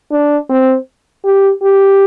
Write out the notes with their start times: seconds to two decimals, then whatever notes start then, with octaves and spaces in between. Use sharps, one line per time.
0.11 D4
0.49 C4
1.25 G4
1.62 G4